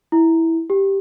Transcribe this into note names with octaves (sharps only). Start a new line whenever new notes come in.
E4
G4